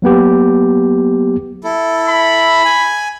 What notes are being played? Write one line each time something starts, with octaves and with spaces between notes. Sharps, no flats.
F#3 A#3 B3 G4
E4 A4
B5
G#5